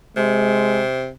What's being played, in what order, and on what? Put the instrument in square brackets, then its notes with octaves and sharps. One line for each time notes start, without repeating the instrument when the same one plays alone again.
[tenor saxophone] C3 [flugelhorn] G#3